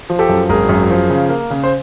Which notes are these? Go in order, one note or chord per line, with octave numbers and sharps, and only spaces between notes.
F3
G4 A4
F#2
G#1 G#4 A#4
F#2
F3
C#3
A#3
C#3
C5